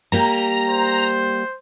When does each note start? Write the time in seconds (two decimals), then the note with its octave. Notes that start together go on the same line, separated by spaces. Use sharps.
0.12 G3 A#3 G4 A#5
0.69 C5